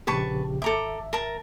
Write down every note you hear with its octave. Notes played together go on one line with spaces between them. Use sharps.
A#1 C#3 G4 B4 A5 C#6
G#1 A4 E5 A#5 D6
A#4 A5 A#5